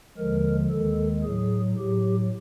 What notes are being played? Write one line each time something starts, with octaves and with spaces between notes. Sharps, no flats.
D#2 D3 F3 G#3 A#4
D#2 D#3 G#3 A4
A2 F#3 G#4
A2 F#3 G4